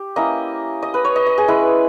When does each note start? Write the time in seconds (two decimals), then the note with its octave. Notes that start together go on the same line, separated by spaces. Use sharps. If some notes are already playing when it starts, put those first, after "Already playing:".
Already playing: G4
0.16 A#3 C#4 E4 D#5
0.82 D#5
0.94 B4
1.04 C#5
1.16 D#5
1.27 D#5
1.38 G#4
1.48 G#3 C#4 E4 B4